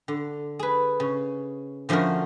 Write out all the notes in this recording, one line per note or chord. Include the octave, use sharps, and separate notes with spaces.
D3
G#4 B4
C#3
D3 F3 A3 C#4 F#4 A#4